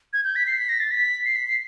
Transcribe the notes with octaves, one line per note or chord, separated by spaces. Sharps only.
G#6
G6
B6
C7
B6
A#6
A6
B6
C7
B6
C7